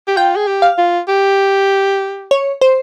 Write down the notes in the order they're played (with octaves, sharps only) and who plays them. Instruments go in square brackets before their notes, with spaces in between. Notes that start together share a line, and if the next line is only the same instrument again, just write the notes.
[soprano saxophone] G4
[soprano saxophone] F4 [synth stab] G5
[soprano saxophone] G#4
G4
[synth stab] F5
[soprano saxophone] F4
G4
[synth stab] C#5
C5